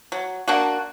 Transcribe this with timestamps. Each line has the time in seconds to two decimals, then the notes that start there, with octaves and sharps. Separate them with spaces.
0.12 F#3
0.48 A#3 D4 F#4